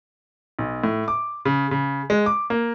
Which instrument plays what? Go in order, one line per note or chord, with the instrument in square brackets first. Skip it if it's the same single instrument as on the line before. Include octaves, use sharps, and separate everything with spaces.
[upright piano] B1
A2
D6
C#3
C#3
G#3
D6
A#3